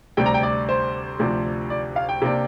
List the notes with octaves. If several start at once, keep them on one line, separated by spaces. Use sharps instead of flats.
D2 C3 G3 D4 G5
A#5
G5
D5
C5
D2 C3 F3 D4
D5
F5
G5
C3 A#3 D4